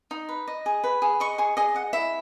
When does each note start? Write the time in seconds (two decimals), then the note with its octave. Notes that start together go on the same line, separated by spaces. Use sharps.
0.11 D#4
0.29 B4
0.48 D#5
0.66 G#4
0.84 B4
1.02 G#4
1.20 D#5 C#6
1.38 G#4 C#6
1.57 G#4 D#5
1.75 D#5 F#5
1.93 E4 E5